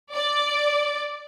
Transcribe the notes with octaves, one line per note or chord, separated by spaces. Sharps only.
D5